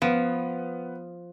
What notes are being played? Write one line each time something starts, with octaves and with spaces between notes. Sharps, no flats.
F3 B3